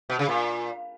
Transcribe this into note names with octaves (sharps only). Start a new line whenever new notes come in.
B2
C#3
A#2